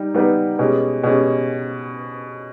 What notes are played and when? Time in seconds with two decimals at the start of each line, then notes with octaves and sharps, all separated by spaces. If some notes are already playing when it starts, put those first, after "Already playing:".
Already playing: G3 D#4 G4
0.14 G3 B3 D#4 G4 B4
0.59 B2 G#3 C#4 G4
1.04 B2 G#3 C#4 G4